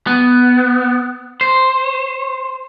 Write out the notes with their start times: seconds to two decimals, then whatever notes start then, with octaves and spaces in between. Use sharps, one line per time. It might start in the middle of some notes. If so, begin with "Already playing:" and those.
0.07 B3
1.41 C5